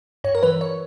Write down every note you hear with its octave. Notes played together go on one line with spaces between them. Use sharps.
G2 C#5
A#4
E3 B4
C#5